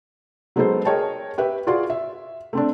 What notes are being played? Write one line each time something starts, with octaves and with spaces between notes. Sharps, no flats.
F#3 G#3 B3 D#4 A4 C5
G#4 A#4 C#5 D#5 G5 A5
G4 B4 E5
F4 F#4 G#4 D5 F5 C6
E5
A3 C4 D4